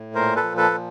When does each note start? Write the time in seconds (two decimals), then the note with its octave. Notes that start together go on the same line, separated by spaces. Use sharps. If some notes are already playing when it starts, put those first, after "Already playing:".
Already playing: A2
0.15 A#2 A#4 C5
0.36 A4 B4
0.43 F3
0.57 A4 B4
0.71 A#2